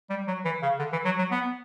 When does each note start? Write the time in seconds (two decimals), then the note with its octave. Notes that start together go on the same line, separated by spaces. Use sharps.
0.10 G3
0.27 F#3
0.45 E3
0.62 C#3
0.79 D3
0.92 E3
1.05 F#3
1.19 F#3
1.31 B3